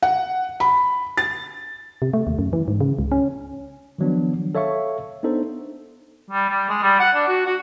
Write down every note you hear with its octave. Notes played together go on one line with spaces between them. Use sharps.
F#5
B5
A6
C3
A3
D#2
F#2
E3
G#2
C#3
C#2
C#4
D#3 F3 F#3 B3 D4
A4 C#5 E5 F5 C#6
B3 D4 D#4 A4 C5
G3
G3
G#3
G3
F#5
D4
F#4
F#4